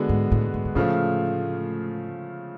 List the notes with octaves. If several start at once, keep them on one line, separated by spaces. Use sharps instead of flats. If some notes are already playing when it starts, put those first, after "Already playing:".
Already playing: D3 G#3 B3 F#4
G#2
A2
G#2
G#2
A2 C#3 F3 A3 F4